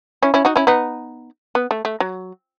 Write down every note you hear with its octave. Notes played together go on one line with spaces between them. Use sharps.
C#4 E4
C#4 E4
D#4 F#4
C#4 E4
B3 D#4
B3
A3
A3
F#3